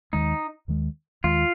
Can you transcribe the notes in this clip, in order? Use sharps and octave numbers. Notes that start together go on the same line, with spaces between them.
D#2 D#3 G#3 D#4
D#2 D#3 G#3
D#2 D#3 G#3 F4